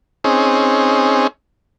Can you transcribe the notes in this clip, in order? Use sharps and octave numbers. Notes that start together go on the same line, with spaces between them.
C4 C#4 D#4 G#4